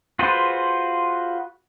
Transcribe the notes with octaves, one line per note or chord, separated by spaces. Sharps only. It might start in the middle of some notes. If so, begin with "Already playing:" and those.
F4 F#4 G#4 B4 C5